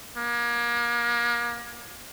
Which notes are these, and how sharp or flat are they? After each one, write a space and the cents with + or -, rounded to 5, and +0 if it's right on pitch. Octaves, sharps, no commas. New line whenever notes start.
A#3 +35